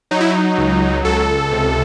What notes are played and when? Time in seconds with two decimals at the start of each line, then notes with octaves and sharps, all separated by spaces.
0.11 F#3 D#4
0.21 E4
0.30 D#4
0.58 C#2
1.05 C#2 A4
1.52 C3